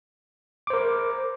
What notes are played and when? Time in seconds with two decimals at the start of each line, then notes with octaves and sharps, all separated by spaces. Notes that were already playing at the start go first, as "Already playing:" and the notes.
0.67 D6
0.70 C5
0.73 A#4